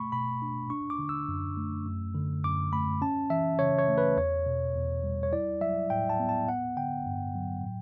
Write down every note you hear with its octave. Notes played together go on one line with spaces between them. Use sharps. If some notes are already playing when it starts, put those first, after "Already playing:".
Already playing: B2 A3 B5 C#6
B2 B5
D4
D4 C#6
D6
D3
E6
F#2
A3
F#2
D3
F#2 D6
A3 B5
C#4 A5
E3 E5
C#3 C#5
C#5
A3
B4
E2 C#5
B2
E2
G3
C#5
E4 D5
F#3 E5
A2 G5
A5
B3
A5
B3 F#5
D3 G5
G2
F#3
A2